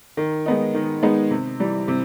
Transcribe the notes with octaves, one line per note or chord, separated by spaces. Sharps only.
D#3
G#3 B3 D#4
D#3
G#3 B3 D#4
C3
E3 G3
C3